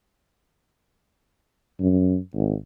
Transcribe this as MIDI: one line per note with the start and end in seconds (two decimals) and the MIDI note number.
1.80 2.17 42
2.35 2.55 32